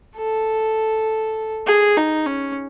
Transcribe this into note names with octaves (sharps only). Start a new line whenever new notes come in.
A4
G#4
D#4
C#4